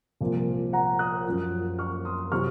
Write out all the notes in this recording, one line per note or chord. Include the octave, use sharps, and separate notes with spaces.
C2 A#2 F3
F#5 A#5
D#6 F#6
F#2 F3
C#6 F6
C6 D#6
C3 F#3 C#6 F6